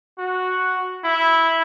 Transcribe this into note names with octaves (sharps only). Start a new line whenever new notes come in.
F#4
E4